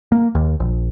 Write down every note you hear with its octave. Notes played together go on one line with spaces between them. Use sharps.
A#3
D#2
A#1